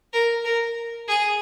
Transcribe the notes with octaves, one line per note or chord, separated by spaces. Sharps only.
A#4
A#4
G#4